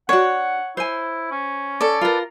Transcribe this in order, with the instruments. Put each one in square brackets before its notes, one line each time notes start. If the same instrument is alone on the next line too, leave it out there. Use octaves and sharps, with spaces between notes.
[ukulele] D4 F#4 [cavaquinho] C#5 [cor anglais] F#5
[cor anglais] E4 [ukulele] C5 G#5
[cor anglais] C#4
[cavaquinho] A4 D5
[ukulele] F4 A#4 [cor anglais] B4